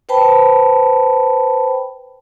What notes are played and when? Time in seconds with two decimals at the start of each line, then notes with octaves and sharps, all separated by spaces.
0.09 B4 C5 G5 A5 B5